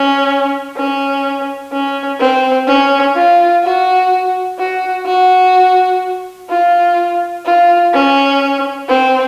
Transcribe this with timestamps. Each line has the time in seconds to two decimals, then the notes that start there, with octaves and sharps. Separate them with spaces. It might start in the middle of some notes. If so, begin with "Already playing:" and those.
Already playing: C#4
0.77 C#4
1.72 C#4
2.20 C4
2.68 C#4
3.16 F4
3.64 F#4
4.59 F#4
5.06 F#4
6.50 F4
7.46 F4
7.93 C#4
8.89 C4